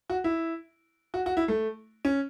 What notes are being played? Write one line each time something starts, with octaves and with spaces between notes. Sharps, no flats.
F#4
E4
F#4
F#4
E4
A3
C#4